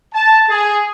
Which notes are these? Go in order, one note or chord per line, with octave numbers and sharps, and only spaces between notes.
A5
G#4